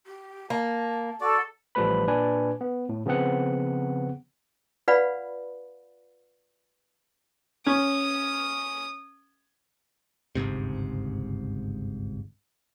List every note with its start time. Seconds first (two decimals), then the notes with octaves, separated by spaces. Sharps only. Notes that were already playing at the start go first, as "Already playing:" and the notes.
0.06 G4
0.50 A#3 A5
1.21 F#4 A4 D5
1.75 A1 F3 G3 A3 B4 B5
2.07 A#2 D4 B4 D5 G#5
2.61 B3
2.89 A2
3.06 C#3 F3 B3 C4 F#5
4.88 F4 B4 D5 F5 F#5 B5
7.66 C#4 D#6
10.35 G1 C#2 G#2 C3